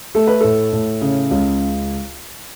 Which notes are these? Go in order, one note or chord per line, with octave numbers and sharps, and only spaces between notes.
A3 A4
B4
A2 A4
A2
C#3
C#2